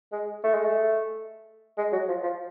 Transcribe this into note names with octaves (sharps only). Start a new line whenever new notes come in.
G#3
A3
G#3
A3
G#3
F#3
F3
F3